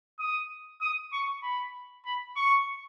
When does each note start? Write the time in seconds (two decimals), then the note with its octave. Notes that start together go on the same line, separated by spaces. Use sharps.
0.19 D#6
0.81 D#6
1.13 C#6
1.43 B5
2.05 B5
2.36 C#6